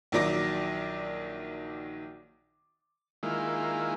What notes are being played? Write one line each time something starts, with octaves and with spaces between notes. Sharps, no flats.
A#1 D#3 F#3 D5 D6 A#6
D#3 G#3 A#3 E4 F4